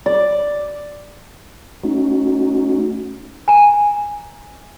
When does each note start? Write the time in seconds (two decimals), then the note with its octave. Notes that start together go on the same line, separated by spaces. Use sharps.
0.06 D5
1.84 A3 C#4 D#4 F#4
3.48 G#5 A#5